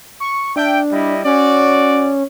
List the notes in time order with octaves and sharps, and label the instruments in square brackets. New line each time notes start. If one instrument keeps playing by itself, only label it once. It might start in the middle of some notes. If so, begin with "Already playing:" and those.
[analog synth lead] C#6
[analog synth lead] D4 [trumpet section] E5 G5
[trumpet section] G3 E4 D#5
[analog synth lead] C#4 [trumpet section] F#4 D5